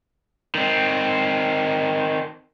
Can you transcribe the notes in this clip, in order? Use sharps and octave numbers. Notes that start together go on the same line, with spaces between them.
D#3 C4